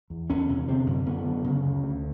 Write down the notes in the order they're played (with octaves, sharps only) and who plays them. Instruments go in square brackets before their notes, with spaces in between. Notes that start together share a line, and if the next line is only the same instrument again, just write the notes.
[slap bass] E2
E2 C#4
C3
D3 C4
F#2
F#2 B3
D3
C#3
D2
D2